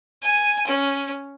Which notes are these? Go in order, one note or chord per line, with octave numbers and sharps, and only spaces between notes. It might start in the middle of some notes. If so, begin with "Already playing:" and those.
G#5
C#4